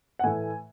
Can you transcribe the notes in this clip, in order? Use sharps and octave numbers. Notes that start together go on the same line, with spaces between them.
F#5
A2 E3 A3 G#5